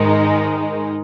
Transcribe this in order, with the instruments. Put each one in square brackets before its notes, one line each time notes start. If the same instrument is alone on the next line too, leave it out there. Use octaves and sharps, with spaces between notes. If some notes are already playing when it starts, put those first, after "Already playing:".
Already playing: [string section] G#2 D#3 G#3 D#4